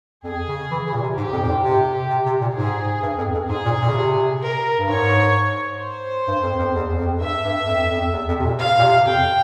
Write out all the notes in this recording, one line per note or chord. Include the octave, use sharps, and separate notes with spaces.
F2 G#4
C#3
E3
C#3
A#2
C3
G#2 G4
F2
A#2
G#2
C3 G4
C3
C3
A#2
G#2 G#4
G2
F2
F2
G#2 G#4
A#2
A#2
C#3
C3
A#4
G2
G#2 C#5
C5
G2
F2
F2
E2
E2
F2
G2 E5
G2
F2
F2
E2
F2
C3
A#2
F5
A#2
C3
F2 G5